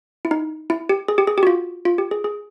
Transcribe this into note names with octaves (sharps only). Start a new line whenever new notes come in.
E4
D#4
E4
G4
G#4
G4
G#4
G4
F#4
F4
F4
G4
G#4
G#4